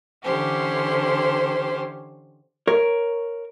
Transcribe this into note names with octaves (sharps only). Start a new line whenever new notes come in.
D3 E3 C#4 G4 C5
A#4 C#5